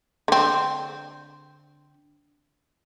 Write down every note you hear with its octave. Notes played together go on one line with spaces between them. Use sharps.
D3 C4